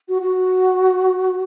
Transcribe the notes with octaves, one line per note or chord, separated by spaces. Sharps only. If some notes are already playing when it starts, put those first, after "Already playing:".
F#4
F#4